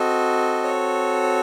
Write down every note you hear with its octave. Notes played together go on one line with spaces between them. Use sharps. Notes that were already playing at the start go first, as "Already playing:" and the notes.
Already playing: C4 F#4 A4 D#5
C#5